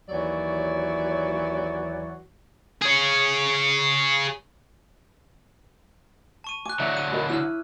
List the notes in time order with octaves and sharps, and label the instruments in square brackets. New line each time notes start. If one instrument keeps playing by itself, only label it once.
[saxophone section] D#2 E3 F#3 F#4 C#5 D5
[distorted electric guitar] G#4 C#5
[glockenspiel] A5 C#6 D#7
[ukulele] G#5 [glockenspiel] D6 F#6
[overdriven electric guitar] D3 F#3 [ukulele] E5 A#5
[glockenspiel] D#7
[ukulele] A#4 D#5 B5
[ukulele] E4 C#5 [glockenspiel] E6 F6